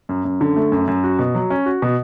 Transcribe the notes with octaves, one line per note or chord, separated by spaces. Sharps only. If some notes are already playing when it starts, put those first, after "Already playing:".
F#2
F#2
D3
A3
F#2
F#2
F#4
B2
F#3
C#4
F#4
B2